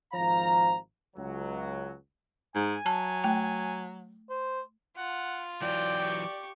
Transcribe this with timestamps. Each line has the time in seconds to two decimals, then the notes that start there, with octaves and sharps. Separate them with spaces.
0.13 G#1 F3 C5 F5 A#5
1.16 C#2 F#3
2.55 G#2 G#5
2.86 F#3 A5
3.24 A3 G5
4.30 C5
4.97 F4 F#5
5.62 E3 F#3 D5 G5
6.00 G4 C#6